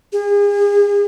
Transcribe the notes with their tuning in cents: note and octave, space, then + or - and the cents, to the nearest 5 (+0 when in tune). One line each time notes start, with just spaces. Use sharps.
G#4 -35